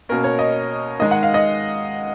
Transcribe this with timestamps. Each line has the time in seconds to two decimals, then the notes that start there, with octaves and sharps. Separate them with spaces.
0.09 B2 A#3 C#4 A#4
0.24 C#5
0.39 D#5
1.00 D#3 G#3 D#4 D#5
1.11 F#5
1.23 F5
1.34 D#5